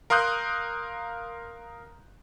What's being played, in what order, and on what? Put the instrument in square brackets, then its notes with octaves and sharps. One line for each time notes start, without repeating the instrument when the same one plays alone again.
[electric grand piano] A#4 F5 C6 D#6 F#6 G6